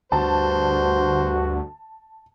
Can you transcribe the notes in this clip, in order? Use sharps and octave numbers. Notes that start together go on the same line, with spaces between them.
D2 G2 F#4 C5 A5